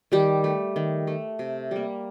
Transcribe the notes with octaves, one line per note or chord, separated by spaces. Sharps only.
D#3 G3 G4
A3
D#3
A3
C3
G3 A#3